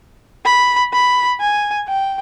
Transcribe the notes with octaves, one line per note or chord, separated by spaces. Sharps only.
B5
B5
G#5
G5